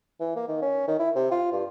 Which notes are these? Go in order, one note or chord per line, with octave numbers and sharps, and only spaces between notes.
E3
A#3
D#3
C#4
D#3
E4
C3
F4
G2